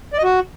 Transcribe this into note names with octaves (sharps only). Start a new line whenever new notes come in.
D5
D#5
F#4